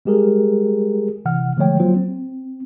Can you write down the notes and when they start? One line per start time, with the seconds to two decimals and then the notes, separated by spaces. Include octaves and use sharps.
0.05 G3 G#3 G4 G#4 A#4
1.25 C3 E3 F#5 F6
1.57 D3 F3 G#3 A3 C#5 G5
1.80 F#3 A#3 F4 C5
1.96 C4